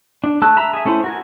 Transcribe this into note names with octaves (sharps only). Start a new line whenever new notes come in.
D4
A3 A5 E6 F#6
E5 A#5 B5
G#4 E5
A3 C#4 E4 C5
F#4 A#4 G#5